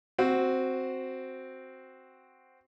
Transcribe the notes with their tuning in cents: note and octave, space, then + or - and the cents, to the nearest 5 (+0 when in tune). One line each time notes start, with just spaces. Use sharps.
C4 +0 F#4 +0